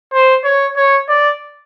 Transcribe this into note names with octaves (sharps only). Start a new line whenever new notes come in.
C5
C#5
C#5
D5